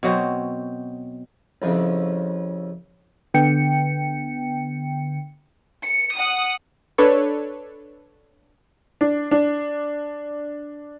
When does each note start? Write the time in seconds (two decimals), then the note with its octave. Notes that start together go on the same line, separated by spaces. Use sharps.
0.03 B2 F#3 C4
1.62 C2 F2 C#3
3.34 D3 B3 G5 C#7
5.83 C#7
6.16 F#5 D#6
6.98 D4 A4 B4 C#5
9.01 D4
9.31 D4